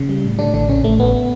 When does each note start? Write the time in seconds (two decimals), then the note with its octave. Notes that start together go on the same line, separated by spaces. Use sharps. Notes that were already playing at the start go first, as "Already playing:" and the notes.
Already playing: C#3
0.09 G3
0.24 A2
0.39 A2 D3 D4
0.54 A1 D3 D4
0.69 A1 C#3 C#4
0.84 A1 A3
0.99 A1 B3